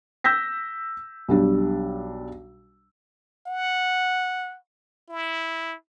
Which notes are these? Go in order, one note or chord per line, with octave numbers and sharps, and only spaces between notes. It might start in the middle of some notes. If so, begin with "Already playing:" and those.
E6 G6 A#6 B6
B1 G3 D4
F#5
E4